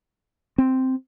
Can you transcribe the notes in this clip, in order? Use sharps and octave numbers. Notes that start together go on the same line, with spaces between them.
C4